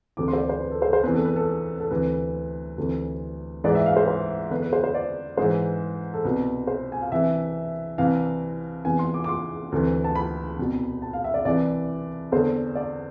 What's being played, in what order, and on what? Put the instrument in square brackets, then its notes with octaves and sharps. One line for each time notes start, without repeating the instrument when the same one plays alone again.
[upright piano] D2 C3 E3 D6
C6
C5
D5
C5
B4
A4
C5
C5
E2 C3 E3 B4
A4
B4
A4
A4
D2 C3 E3 B4
D2 C3 E3
G#2 E3 D5
E5
F5
C5
C5
E2 D3 B4
B4
C5
C5
D5
G#2 E3 C5
A4
C2 B2 B4
C5
G#5
F5
C2 C3 E3 E5
C2 C3 E3 F5
E2 C3 E3 G#5
C6
D6
D6
C6
D2 C3 E3
A5
B5
C2 B2
A5
F5
E5
D5
C2 C3 E3 D5
E2 D3 C5
D5